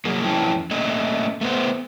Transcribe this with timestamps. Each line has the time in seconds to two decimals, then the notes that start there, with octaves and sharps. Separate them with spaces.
0.05 F#3 A#3 G#4 A#4
0.24 F2 E3 C#4 E4 G5 A5
0.71 A3 A#3 C#4 D#5
1.41 A3 B3 C5